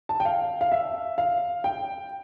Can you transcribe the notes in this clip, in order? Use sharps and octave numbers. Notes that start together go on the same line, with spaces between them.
A5
G5
F5
F5
E5
F5
G5